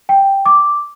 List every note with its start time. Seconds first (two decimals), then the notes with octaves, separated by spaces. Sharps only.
0.09 G5
0.46 D6